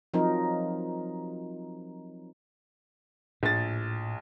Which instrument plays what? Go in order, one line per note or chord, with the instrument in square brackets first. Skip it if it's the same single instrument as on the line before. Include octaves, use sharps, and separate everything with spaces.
[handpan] F3 F#3 C4 D#4 A#4
[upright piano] A#1 A6 [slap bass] A2